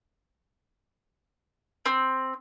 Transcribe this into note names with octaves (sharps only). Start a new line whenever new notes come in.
C4